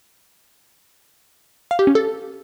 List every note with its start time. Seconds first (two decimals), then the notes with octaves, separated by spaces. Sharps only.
1.71 F5
1.79 G4
1.87 C#4
1.95 A4